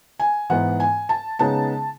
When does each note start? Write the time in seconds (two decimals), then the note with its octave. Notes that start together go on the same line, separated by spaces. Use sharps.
0.19 G#5
0.50 G#2 E3 B3 D#4 F#5
0.80 G#5
1.09 A5
1.39 C#3 G#3 B3 D#4 A5